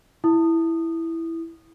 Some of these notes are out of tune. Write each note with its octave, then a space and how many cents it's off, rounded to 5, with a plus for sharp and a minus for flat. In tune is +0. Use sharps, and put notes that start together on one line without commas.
E4 +0 D#6 -15